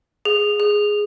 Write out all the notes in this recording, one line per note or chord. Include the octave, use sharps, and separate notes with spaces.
G#4
G#4